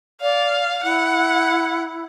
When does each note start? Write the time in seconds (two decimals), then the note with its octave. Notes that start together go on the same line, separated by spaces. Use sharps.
0.21 D5 F5
0.84 E4 F#5